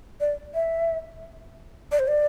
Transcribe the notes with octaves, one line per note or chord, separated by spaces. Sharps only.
D5
E5
D5
C5
D5